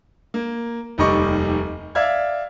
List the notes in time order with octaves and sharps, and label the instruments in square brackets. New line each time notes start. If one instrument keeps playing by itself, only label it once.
[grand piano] A#3
F1 D#2 G3 D#5 C#6 D6
D5 E5 F5 E6 F6 G#6